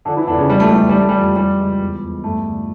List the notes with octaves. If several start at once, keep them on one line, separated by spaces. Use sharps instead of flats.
D3 F3 D4
E3 E4
E2 D3 D4
C#3 C#4
C#2 G3
A3
E3 G3
A3
E3 G3
A3
G3
F2
E3 G3
C#2
E2
E2
G2 A3
D3